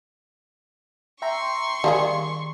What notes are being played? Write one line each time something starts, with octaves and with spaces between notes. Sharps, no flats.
E5 G5 A#5 C6 C#6
D#3 G3 A#3 G#4